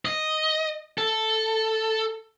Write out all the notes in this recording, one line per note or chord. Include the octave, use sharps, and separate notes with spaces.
D#5
A4